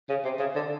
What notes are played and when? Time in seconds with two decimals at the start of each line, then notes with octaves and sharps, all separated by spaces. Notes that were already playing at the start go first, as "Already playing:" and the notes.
0.09 C#3
0.25 C3
0.40 C#3
0.56 D3